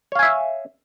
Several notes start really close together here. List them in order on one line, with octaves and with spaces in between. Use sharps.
C#5 F5 G#5 E5